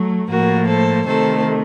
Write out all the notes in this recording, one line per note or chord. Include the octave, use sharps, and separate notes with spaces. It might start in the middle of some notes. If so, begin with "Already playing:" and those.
Already playing: F#3 A3
A2 F3 A#3 F#4 A#4
A4 C5
C3 D#3 A3 A4 C5